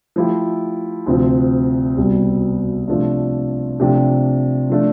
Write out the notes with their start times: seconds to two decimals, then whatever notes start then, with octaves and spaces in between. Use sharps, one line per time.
0.16 F3 A3 E4 G4
1.06 D2 C3 F3 C4
1.97 C2 B2 G3
2.88 C3 F3 A3 D4
3.80 C3 F3 A3 D4 G4
4.70 F3 A3 D4